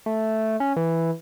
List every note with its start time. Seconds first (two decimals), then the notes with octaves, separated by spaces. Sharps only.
0.06 A3
0.60 C#4
0.77 E3